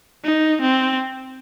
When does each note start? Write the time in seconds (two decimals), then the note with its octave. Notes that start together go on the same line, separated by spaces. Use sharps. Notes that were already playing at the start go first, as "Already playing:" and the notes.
0.24 D#4
0.61 C4